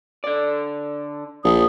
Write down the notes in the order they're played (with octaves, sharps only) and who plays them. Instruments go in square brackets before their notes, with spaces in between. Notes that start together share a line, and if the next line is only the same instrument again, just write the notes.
[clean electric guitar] D3 D5
[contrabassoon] A#1 [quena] D#6